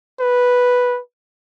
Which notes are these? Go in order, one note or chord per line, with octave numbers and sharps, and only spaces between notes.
B4